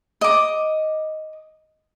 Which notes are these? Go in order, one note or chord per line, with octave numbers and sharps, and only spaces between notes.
D#5 D6